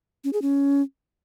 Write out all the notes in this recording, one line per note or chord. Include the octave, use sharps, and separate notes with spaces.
C#4
G#4
C#4